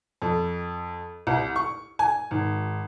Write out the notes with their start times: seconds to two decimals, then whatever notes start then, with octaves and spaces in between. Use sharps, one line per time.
0.22 F2
1.27 C2
1.56 C#6
1.99 G#5
2.31 G#1